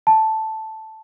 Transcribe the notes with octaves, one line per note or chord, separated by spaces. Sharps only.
A5